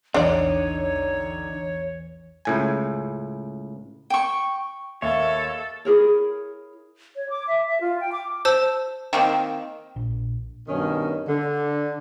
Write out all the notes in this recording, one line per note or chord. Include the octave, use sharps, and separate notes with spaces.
A#1 E2 D3 E3 D4 D#4 C#5 D5
C#2 A2 G#5
G5 C#6
D#2 A4 C#5 E5
E4 G#4 A#4 C#5
C#5
D6
E5
E5
F4
G5
D6
C5 A5 E6
D#3 A#3 C4
A#1
G2 B2 D#3 C#4
D3